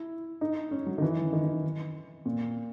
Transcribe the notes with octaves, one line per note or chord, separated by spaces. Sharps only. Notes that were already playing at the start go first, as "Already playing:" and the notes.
Already playing: E4
D#4
C#4
F#3
D#3
E3
D#3
D#3
A#2